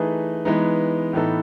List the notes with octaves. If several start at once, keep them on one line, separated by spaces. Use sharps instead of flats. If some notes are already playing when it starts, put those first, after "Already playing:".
Already playing: E3 A3 D#4 G#4 B4
E3 G#3 B3 D#4
A2 E3 B3 D#4 A4